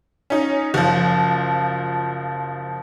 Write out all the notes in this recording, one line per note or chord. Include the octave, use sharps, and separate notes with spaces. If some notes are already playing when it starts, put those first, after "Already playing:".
C#4 D#4
F#1 F3